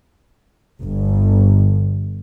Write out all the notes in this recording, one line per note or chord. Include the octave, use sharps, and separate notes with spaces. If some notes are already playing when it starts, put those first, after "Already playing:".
G1